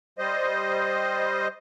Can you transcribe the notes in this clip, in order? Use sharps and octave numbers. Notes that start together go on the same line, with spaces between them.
G3 C5 D#5